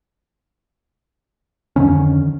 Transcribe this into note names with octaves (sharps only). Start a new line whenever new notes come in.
F2 D3 D#3 C#4